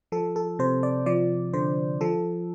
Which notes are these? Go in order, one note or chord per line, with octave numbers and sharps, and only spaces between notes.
F3 A4
A4
C3 C5
D5
F3 D5
D3 C5
F3 A4